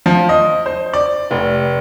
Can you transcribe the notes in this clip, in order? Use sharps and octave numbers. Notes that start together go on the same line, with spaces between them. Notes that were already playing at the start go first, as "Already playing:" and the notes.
F3
D#5
C5
D5
F1